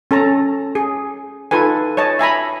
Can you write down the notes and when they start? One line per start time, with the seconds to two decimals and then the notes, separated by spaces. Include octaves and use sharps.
0.11 C#4 A4 A5 A#5
0.75 G#4
1.51 D#4 F4 A4 B4 G#5
1.97 C#5 D#5 A5
2.19 E5 G#5 A#5 B5